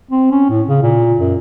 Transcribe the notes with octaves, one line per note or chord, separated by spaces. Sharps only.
C4
C#4
A2
C#3
A#2
F#2